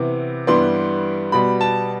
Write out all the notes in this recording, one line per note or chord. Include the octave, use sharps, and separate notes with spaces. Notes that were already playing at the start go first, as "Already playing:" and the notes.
Already playing: C3 E3 B3
G2 E3 G3 B3 C6
B2 G3 B3 B5
A5